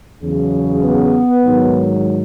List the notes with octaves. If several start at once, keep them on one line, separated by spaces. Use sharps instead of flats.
E2 C#3 F#3
B3
G#2 D#3 F#3